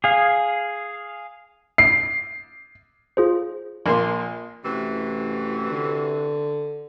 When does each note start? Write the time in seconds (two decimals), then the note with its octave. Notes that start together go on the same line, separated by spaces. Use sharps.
0.04 G#4 F5
1.78 C7
3.17 F4 G#4 C5
3.86 A#1 A#3 C6
4.64 A1 C3 E3 F#4
5.70 D3